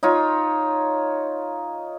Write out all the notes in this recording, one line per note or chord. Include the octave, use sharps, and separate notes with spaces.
D#4 F4 C#5